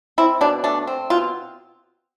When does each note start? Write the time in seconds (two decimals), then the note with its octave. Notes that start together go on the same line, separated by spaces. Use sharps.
0.18 C4 E4
0.41 B2 D4
0.64 A3 D4
0.87 C4
1.10 B2 F4